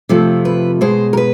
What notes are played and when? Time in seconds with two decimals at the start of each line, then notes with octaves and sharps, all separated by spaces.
0.09 F2 C3 F3 A3
0.45 B4
0.81 B2 G#3 C5
1.13 A#4
1.17 B4